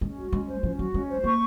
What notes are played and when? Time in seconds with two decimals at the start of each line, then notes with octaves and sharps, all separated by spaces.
0.01 G#3 C#4
0.17 F#4
0.32 G#3 C#4
0.48 C5
0.63 F3 C#4
0.78 F#3 F#4
0.94 G#3 C#4
1.09 C5
1.24 A#3 C#6